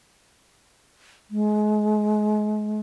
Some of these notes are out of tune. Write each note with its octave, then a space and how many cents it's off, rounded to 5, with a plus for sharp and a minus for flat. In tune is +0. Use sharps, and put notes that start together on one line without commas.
G#3 +30